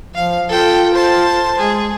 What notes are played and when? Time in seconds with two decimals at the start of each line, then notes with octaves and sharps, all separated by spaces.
0.14 F3 F5
0.49 F4 A4 G5
0.94 C5 A5
1.59 G#3 G#4